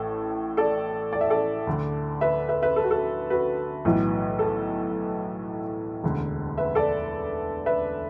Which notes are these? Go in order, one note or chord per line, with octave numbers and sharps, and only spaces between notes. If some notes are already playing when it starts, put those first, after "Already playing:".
Already playing: A1 A2 A4
A4 D5
D5
E5
A4 D5
D2 D3
B4 E5
B4 E5
B4 E5
A4
F#4
A4
F#4 B4
B1 A2 E3
A4
E1 D2 D3
B4 E5
A4 D5
B4 E5